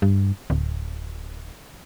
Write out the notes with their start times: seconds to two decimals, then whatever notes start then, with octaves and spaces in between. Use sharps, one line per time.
0.02 G2
0.50 D1